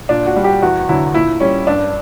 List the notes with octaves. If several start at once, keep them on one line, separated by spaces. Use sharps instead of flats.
A#2 D4
F#4
G3
G4
E2 F#4
D3 F#3 E4
A#2 E4
G3 C#4
G2 D4